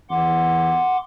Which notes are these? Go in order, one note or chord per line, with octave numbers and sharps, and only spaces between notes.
E2 F#5 C6 D6